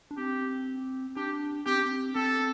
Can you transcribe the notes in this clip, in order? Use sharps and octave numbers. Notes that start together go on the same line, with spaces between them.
D4
C4 G4
D4 G4
C4 G4
D4
C4
C4 A4